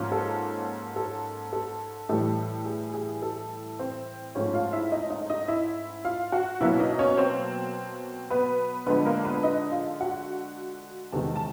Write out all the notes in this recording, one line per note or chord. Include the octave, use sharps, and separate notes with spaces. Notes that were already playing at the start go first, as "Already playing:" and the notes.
Already playing: G#2 F3 A#3 C#4
A4
A4
A4
A2 E3 G3 A4
G#4
G#4
A4
C4 C5
G#2 F3 A3 C#4 C#5
F4 F5
E4 E5
D#4 D#5
D#4 D#5
D#4 D#5
E4 E5
F4 F5
F#4 F#5
B2 F#3 A#3 C#4 E4 E5
D#4 D#5
C#4 C#5
C4 C5
B3 B4
D3 F3 G#3 B3 B4
A#3 A#4
B3 B4
D#4 D#5
F4 F5
F#4 F#5
E2 C3 D#3 G#3 A4 A5
A5